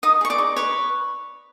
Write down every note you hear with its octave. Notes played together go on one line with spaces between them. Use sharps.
D#4 D#5 D#6
G#4 C#6
D5 D6
D#4
B4 C#5 C#6